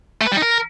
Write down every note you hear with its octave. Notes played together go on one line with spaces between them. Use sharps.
A3
B4
G3
D#4
A#4